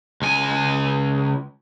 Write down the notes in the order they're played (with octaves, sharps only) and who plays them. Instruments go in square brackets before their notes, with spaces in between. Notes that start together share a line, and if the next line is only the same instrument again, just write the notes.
[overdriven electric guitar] C#2 G#5